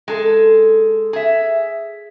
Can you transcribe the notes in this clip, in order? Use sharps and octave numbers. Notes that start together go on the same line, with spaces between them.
G#3 A4
G#4 E5